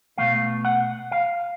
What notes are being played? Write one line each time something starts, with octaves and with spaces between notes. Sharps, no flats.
B2 F#3 A3 F5
F#5
F5